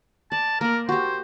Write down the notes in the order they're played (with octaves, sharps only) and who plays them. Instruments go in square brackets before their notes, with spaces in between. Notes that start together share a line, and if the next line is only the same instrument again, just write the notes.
[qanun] D5 [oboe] A5
[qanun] A#3 D5 [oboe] A#4
[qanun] F#4 G4 [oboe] C5